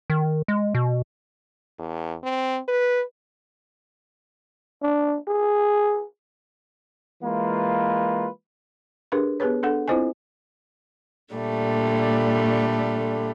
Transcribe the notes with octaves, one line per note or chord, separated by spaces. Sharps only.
D#3
G#3
B2
E2
C4
B4
D4
G#4
E3 G#3 A#3 F4 B4
D4 G4 G#4 A#4 B4
B3 G4 G#4 B4 C#5
D4 A4 F#5
C4 E4 F4 C5 D#5 G#5
A#2 D3 G3 A3